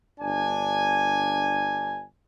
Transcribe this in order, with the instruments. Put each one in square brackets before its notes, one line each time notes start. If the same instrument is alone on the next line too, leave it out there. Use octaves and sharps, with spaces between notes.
[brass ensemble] G1 D4 G#5